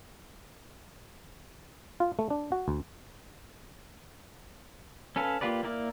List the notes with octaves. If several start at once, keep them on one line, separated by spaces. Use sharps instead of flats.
F4
A3
D4
F#4
D2
C#4 A4 B4 F5
A#3 F4 G4 B4 D5
A#3 E4 A#4 D5